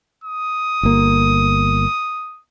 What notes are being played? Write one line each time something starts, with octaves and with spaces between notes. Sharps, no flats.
D#6
G1 A#3